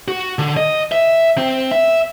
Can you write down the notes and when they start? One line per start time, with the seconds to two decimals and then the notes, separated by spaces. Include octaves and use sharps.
0.08 F#4
0.39 D3
0.57 D#5
0.92 E5
1.38 C4
1.72 E5